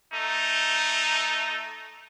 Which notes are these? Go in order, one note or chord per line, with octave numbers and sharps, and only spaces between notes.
A3 D#4